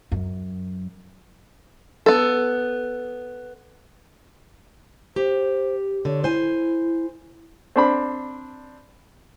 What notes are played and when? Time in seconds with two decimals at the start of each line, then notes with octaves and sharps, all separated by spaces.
0.12 F#2
2.06 B3 A4
5.16 G4 C5
6.05 D3 C#5
6.24 E4 C5 G#5
7.76 C4 D4 B5